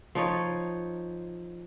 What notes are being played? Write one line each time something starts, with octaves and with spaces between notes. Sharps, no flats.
F3 D#4 C#5